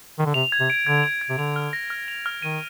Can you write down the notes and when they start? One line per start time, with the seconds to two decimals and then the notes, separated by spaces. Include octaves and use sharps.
0.19 D#3
0.26 D3
0.34 C3 F7
0.52 G#6
0.60 C3
0.70 D7
0.87 D3 G#6
1.04 F7
1.21 G#6
1.30 C3
1.38 D3 F7
1.56 F6
1.73 A#6
1.90 F6
2.08 F7
2.26 F6
2.42 D#3 D#7